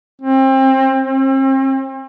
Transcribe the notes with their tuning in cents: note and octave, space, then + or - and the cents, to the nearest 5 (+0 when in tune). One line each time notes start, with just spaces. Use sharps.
C4 +30
C4 +40